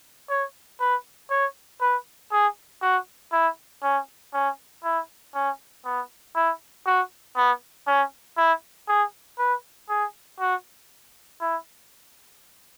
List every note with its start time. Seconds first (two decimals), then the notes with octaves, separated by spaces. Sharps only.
0.30 C#5
0.80 B4
1.31 C#5
1.81 B4
2.32 G#4
2.82 F#4
3.32 E4
3.83 C#4
4.34 C#4
4.84 E4
5.35 C#4
5.85 B3
6.35 E4
6.86 F#4
7.37 B3
7.87 C#4
8.37 E4
8.88 G#4
9.39 B4
9.89 G#4
10.40 F#4
11.41 E4